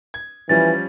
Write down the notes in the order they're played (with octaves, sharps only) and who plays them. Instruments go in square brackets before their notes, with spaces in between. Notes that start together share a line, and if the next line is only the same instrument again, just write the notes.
[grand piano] G#6
[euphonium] E3 [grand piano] F3 G3 C#4 [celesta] A6